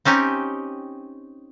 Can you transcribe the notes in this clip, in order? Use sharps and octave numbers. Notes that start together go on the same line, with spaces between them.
C4 C#4 D#4 G4